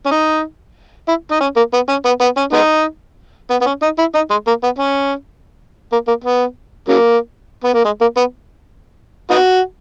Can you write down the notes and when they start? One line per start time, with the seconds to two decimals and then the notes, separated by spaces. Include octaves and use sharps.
0.06 C#4
0.11 D#4
1.08 E4
1.31 D#4
1.40 C#4
1.56 A#3
1.73 B3
1.89 C#4
2.05 B3
2.21 B3
2.37 C#4
2.53 G#3 B3 D#4
3.50 B3
3.61 B3
3.66 C#4
3.82 D#4
3.98 E4
4.15 D#4
4.30 G#3
4.47 A#3
4.63 B3
4.79 C#4
5.92 A#3
6.08 A#3
6.24 B3
6.88 C#3 F#3 A#3
7.64 B3
7.74 A#3
7.85 G#3
8.01 A#3
8.17 B3
9.30 B3 D#4 F#4